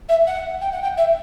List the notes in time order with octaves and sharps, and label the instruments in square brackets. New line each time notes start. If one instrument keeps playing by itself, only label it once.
[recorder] E5
F#5
G5
F#5
G5
E5